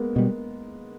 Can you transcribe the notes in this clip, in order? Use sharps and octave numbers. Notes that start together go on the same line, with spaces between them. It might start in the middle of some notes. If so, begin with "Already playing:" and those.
Already playing: G#3 A#3 B3
B2 G3